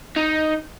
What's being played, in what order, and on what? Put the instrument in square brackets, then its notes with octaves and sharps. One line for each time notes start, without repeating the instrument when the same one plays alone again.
[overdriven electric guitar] D#4